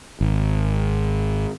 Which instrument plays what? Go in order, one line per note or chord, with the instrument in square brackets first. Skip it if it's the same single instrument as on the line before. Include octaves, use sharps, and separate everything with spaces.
[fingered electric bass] G#1